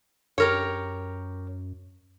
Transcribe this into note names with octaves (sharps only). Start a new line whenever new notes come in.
F#2 G4 A#4 C#5